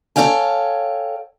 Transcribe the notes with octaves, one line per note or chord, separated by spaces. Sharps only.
A4 A#4 C#5 F5 G5 G#5